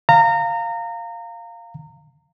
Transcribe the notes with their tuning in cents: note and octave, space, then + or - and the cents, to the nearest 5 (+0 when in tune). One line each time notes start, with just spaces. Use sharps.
F5 +0 A#5 -25